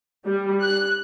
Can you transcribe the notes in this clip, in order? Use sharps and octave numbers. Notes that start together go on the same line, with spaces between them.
G3
F#6